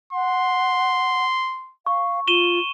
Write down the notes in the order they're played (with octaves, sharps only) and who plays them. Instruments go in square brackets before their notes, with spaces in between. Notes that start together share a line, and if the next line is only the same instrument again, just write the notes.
[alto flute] F#5 [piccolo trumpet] C6
[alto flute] F5 [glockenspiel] C#6
[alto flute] F4 [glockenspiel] D#7 E7 G7